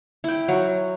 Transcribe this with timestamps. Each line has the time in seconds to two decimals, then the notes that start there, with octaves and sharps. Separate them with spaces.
0.24 E4 G5
0.48 F#3